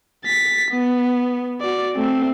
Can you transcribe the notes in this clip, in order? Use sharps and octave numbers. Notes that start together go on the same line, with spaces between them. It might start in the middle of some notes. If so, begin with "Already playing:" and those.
A6 B6
B3
F#4 D5
A3 C4